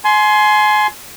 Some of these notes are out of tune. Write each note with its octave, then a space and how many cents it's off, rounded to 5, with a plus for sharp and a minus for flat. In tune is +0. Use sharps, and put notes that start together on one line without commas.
G#5 +30 C6 +0